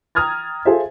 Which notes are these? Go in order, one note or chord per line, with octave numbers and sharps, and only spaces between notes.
G5 A#5 D#6 F6 G#6 A6
F4 G#4 A4 C5 E5